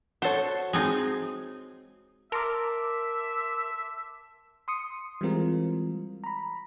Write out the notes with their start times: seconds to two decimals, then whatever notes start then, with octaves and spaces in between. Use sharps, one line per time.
0.22 F#4 A4 C5 C#5
0.73 G#3 C4 D#4
2.32 A#4 E5 A5 C6 D6
4.68 C6 D#6 C#7
5.21 E3 G3 G#3 C4 F4 A#4
6.24 A#5 B5